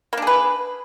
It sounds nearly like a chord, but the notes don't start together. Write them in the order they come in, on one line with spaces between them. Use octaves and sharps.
A#3 D4 G#4 B4